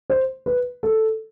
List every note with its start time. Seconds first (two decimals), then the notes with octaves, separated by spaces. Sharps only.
0.10 C5
0.46 B4
0.83 A4